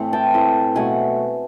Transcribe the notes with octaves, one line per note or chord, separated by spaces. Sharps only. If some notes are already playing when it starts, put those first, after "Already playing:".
Already playing: A2 E3 A3 C4
G5 A5
A2 E3 A3 C4
B2 F#3 A3 F#5 G#5